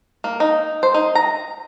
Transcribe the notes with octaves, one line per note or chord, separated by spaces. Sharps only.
A#3
D#4
C5
D#4
A#5